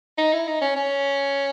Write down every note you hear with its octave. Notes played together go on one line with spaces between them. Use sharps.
D#4
E4
D#4
C#4
C#4